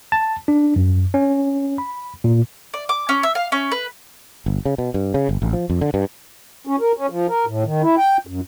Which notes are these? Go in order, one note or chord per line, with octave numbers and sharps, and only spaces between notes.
A5
D4
F#2
C#4
B5
A#2
D5
D6
C#4
E5
F5
C#4
B4
G1
C#3
B2
G2
C#3
G1
A1
F3
F2
D3
G2
C#4
A#4
C#4
F3
A#4
A2
D#3
E4
G5
F#2